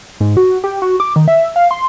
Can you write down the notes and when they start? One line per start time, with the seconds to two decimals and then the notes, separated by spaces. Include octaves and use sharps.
0.20 G#2
0.37 F#4
0.64 G4
0.82 F#4
1.00 D6
1.16 D#3
1.28 E5
1.56 F5
1.71 C6